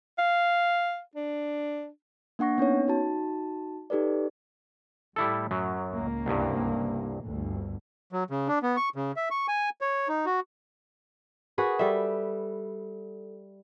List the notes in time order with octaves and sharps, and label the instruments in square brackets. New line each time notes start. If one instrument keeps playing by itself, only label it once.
[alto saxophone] F5
D4
[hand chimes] A#3 D4 F#5 C#6 A#6
B3 C#4 D#4 C#5
D#4 F#4 A5
D#4 G4 A4 B4 D5
[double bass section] A2 [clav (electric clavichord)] G3 E4 A4
[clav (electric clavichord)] F#2 F#3
[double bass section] C#2 A#3 C#4
[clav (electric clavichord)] C2 G2
[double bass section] G1 D2 G2
[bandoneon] F#3
C#3
D4
B3
C#6
C#3
E5
C#6
G#5
C#5
D#4
F#4
[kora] F#4 G#4 B4 [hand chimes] A#4 F#5
[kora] G3 E5 [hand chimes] A4